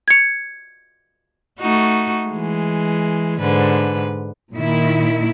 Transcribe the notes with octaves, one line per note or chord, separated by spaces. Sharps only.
G#6 C#7
A3 D#4 F#4
E3 G#3
G#2 D3 B4
A#2 D#3 E4